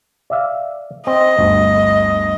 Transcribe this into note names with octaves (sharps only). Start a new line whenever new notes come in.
D5 E5 F5
C4 D#5
G1 D2